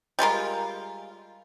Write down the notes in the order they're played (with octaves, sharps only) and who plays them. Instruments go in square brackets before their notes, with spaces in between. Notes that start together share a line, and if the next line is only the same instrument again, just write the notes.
[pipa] G3 G#3 F4 A#4